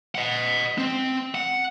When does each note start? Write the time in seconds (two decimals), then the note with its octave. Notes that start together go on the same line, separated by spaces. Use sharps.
0.15 D#5 F#5
0.78 C4
1.35 F#5